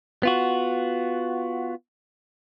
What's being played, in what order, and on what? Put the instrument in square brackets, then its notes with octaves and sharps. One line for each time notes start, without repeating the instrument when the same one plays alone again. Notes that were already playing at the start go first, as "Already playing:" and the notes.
[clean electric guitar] B3 F4 F#4